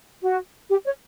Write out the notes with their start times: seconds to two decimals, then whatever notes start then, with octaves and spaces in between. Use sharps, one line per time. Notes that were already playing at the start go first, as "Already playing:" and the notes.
0.21 F#4
0.69 G4
0.85 C#5